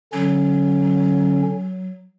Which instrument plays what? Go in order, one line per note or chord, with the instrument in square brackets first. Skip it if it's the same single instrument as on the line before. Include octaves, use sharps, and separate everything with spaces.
[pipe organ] D3 C#4 [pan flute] F#3